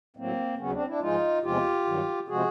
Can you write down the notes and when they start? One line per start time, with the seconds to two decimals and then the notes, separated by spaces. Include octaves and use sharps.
0.17 A2 F#3 A#3 C4
0.58 D#2 C#3 F#3 B3 C#4
0.73 C4 D4
0.87 D4 E4
1.00 G#2 F3 G#3 D#4 F4
1.43 E2 C3 F3 G#3 F4 G4
1.85 G2 D#3 F#3
2.28 C3 F3 G#3 F#4 G#4